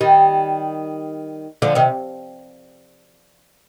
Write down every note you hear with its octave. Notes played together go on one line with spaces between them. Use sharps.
D#3 G3
D3 F3
C3 D#3